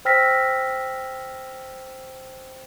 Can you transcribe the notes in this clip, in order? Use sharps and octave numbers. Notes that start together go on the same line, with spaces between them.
C5 G5 E6 F6 A#6 B6